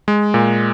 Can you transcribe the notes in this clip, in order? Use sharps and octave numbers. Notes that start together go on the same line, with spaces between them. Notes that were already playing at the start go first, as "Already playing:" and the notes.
G#3
A#2